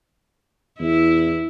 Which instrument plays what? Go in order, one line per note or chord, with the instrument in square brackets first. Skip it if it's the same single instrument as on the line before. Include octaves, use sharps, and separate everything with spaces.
[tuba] E2 [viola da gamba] E4